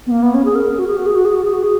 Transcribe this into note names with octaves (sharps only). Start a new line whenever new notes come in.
B3
A#3
B3
C#4
G#4
A#4
F#4
G#4
F#4
G#4
F#4
G#4
F#4
G#4
F#4
G#4